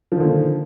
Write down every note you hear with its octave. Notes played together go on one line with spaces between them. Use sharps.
A#2 D3 D#3 F3